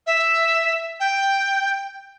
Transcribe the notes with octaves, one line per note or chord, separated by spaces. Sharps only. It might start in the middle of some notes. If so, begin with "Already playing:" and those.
E5
G5